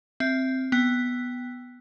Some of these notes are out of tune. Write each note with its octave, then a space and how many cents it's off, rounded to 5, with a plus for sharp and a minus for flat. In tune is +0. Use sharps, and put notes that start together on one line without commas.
C4 +0 E5 +0
B3 +0 G5 +0